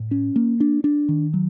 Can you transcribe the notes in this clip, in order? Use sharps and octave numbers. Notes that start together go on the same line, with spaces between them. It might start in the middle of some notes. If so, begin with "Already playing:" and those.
Already playing: A2
C#4
A#3
D4
D4
D#3
F#3